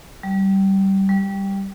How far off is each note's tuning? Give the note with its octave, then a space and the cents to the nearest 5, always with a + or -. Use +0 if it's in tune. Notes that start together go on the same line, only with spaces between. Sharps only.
G3 -20
G3 +0